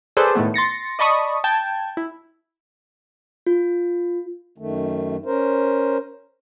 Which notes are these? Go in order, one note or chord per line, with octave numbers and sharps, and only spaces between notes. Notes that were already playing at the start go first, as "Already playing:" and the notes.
G#4 A4 B4 C5 D5
A2 D#3 A3 B3
C6 A6 A#6 C#7
D5 D#5 A5 B5 C#6 D#6
G5 A5 G6 G#6
E4
F4
F#2 D#3 A3
C#4 A#4 C5